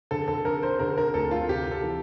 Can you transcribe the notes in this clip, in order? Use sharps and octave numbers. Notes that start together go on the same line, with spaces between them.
D3 A4
A4
D3 A#4
C5
D3 A#4
A#4
D2 A4
F4
C3 G4
A4
E3